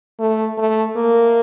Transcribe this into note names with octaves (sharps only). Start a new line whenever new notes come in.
A3
A3
A#3